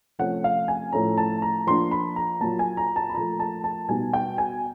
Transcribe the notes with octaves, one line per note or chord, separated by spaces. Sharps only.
C3 F3 A3 C#4 F#5
F5
G#5
A2 F3 A3 C#4 A#5
A5
A#5
F3 A#3 D4 C6
B5
A#5
A#2 F#3 A#3 A5
G#5
A#5
A5
B5
A#2 F3 A3 A#5
A5
A5
B2 G3 B3 D#4 G#5
G5
G#5